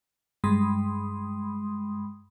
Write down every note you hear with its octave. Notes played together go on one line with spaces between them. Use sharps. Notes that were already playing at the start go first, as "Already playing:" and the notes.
G2 G#3 B5 C6 D#6